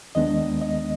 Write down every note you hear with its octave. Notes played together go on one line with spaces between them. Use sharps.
D#2 D#3 G#3 B3 D4 D#5
D#5